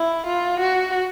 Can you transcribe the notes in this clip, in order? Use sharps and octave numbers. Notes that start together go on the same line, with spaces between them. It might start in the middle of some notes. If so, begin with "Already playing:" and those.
Already playing: E4
F4
F#4